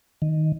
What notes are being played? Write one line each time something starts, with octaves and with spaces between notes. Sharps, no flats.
D#3